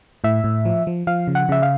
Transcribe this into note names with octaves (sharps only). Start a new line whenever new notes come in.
A2 E5
A2
F3
F3
F3 F5
C#3
F#5
C#3 E5
F5